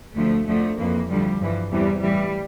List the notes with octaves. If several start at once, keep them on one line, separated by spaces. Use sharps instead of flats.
D2 D3 F3 A3
F2 D3 F3 A3
F2 E3 A#3
D2 D3 F3 G3
G2 E3 F3
E2 C3 E3 G3
A2 E3 G3